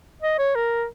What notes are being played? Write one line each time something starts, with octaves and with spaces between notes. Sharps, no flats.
D#5
C#5
A#4